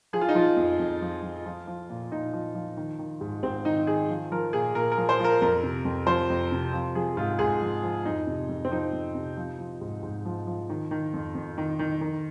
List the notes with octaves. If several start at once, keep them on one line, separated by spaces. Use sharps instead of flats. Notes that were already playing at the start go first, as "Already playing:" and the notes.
F3 G#4
F4
D#4
F3 F4
F2
F2
F3
F3
F3
F3
A#2
A#2 D#4
F3
F3
D#3
D#3
G#2
G#2 C4
D#3 D#4
D#3 G#4
F3
F3 A#4
A#2 G#4
A#2 A#4
A#4
F3
C5
F3 A#4
F2 A#4
C3
F2
F3 C5
F2
C3
F3
F3 G#4
G#2 F4
G#2 G#4
F3
F3
F2 D#4
C3
F2
C4
F3 D#4
F2
C3
F3
F3
G#2
G#2
F3
F3
D#3
D#3
F2
F2
D#3
D#3
D#3